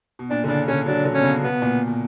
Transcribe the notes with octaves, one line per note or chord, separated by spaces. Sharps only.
B2
A#2 D4
D3
C#3 D4
D3 C#4
F#3 D4
D3
B2 C#4
C#3
B2 B3
A#2
B2